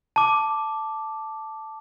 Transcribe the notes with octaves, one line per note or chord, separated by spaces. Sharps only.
A5 D6